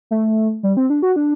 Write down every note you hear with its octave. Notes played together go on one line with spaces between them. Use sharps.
A3
G3
C4
D4
F#4
D4